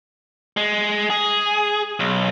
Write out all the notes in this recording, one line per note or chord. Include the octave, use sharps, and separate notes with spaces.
G#3
G#4
B1